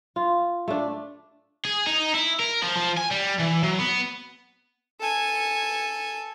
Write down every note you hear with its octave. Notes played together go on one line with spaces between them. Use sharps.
F4
A3 D4
G#4
D#4
E4
A#4
F3
F3
G#5
G3
E3
F#3
B3
A4 G#5